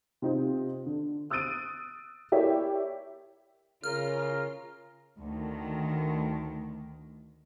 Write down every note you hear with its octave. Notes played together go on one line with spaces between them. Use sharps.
C3 C4 D#4 F4
D3
D#6 E6 F#6 A6 D7 D#7
E4 G4 A#4 C#5 D5 E5
C#3 F4 A#4 F6
D2 D#3